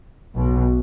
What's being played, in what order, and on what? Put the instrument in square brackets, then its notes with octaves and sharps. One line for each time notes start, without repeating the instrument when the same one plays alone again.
[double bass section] B1 B2